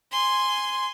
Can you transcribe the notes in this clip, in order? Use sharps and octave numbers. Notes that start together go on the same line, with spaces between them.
G#5 C6